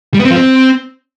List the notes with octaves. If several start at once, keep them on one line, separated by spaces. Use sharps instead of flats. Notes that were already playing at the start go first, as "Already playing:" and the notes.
G3
B3
C4
F3
C4